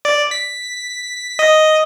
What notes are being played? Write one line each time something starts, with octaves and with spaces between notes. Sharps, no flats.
D5
B6
D#5